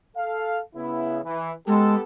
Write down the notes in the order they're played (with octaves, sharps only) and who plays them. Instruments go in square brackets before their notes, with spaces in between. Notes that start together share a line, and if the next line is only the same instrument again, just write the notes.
[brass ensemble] A4 F5
C#3 B3 E4
E3
[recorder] G#3 [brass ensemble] B3 G4 A4